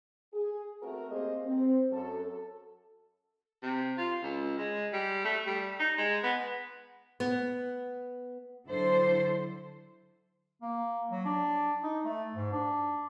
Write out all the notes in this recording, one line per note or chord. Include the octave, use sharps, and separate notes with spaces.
G#4
A3 C4 F#4 A#4
A#3 C4 G4 G#4 C5 D#5
C4
F#2 A4
A4
C3
F4
C#2
G#3
G3
A3
G3
D#4
G#3
B3
B3
D3 F#3 E4 A4 C5
A#3
F#3
D4
D#4
A3
G#2
D4